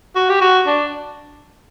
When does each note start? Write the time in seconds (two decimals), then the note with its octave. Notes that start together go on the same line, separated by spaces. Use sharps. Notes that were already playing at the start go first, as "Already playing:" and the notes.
0.15 F#4
0.29 G4
0.41 F#4
0.67 D4